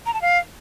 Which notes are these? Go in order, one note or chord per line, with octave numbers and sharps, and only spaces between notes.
A#5
A5
F5